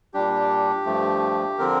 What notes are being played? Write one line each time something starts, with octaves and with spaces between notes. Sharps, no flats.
A#2 G3 D4 G4
G2 F3 A3
D3 F3 C4 A#4